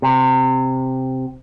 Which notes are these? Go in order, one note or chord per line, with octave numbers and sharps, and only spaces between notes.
C3